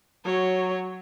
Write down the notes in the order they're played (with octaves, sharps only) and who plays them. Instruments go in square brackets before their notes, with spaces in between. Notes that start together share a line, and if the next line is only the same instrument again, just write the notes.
[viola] F#3 C#5